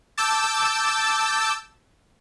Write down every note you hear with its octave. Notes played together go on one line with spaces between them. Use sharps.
A5 D6 E6 G6 A6